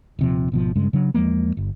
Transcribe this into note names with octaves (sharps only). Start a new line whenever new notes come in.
D#1 C3 F3
G#1 B2 F3
G2 C#3 G#3
C#3 F#3 D4
E2 F3 G#3 A#3
G1